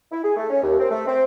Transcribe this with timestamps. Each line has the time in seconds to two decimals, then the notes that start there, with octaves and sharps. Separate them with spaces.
0.12 E4
0.24 G#4
0.37 A3
0.50 C#4
0.63 D#2
0.79 C4
0.91 A3
1.07 C4